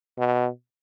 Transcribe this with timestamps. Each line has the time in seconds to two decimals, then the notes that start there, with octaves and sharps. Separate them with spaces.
0.18 B2